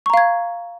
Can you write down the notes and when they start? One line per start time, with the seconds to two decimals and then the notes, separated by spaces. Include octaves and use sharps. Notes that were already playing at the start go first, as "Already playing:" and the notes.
0.06 C#6
0.10 A#5
0.14 F5
0.17 G#6